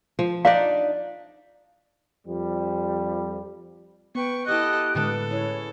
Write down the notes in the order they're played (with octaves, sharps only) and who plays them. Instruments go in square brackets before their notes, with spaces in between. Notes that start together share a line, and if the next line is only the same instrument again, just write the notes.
[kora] F3
[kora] D4 D#4 D5 [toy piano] F5
[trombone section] F2 F3 G3
[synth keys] B3 [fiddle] B4 C#6 [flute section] G5
[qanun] E4 F#5 G#5 [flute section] G4 D#6 F#6 [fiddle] A4 D#5
[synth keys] A2 D3 G#3 [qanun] G3 B3 [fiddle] A4
[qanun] C#4 E4 G#4 [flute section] C#5